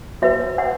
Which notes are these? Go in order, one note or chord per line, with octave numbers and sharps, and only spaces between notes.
F#4 B4 E5
F#5